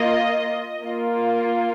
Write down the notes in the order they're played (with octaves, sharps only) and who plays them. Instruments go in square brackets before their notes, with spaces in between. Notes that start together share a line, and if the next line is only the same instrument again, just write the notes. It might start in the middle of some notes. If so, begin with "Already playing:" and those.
Already playing: [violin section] A#3 F4 D#5
A#3 F4